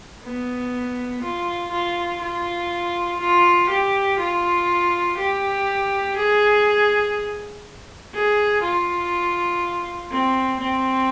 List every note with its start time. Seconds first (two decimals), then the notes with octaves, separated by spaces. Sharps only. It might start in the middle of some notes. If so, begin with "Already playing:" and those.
0.24 B3
1.23 F4
1.72 F4
2.21 F4
3.20 F4
3.70 G4
4.19 F4
5.18 G4
6.17 G#4
8.14 G#4
8.63 F4
10.12 C4
10.61 C4